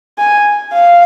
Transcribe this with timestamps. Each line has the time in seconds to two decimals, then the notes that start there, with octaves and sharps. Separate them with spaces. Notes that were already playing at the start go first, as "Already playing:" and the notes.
0.18 G#5
0.73 F5